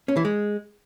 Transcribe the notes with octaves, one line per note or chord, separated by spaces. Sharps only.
C#4
E3
G#3